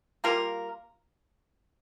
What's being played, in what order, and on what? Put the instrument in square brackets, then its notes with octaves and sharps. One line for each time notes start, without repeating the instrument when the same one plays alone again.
[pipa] G3 A#3 F4 A#4